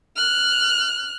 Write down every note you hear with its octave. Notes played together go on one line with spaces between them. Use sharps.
F6 F#6